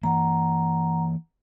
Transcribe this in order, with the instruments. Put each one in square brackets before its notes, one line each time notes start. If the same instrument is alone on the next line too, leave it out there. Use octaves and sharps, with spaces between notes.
[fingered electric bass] E3 A#3 [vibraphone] F#5 A#5